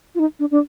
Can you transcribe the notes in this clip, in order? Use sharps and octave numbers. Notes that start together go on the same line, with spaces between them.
F4
D#4
D4
D4